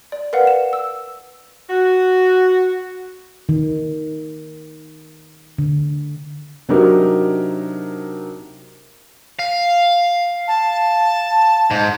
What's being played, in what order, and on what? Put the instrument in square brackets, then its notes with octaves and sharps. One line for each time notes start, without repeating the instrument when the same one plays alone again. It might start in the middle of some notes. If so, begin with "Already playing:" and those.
[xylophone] D5
A#4 B4 D5 F5 F#5
E7
E6
[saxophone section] F#4
[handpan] D#3
D3
[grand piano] C3 F#3 D4 D#4 G4 A#4
[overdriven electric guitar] F5
[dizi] A5
[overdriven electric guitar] G#2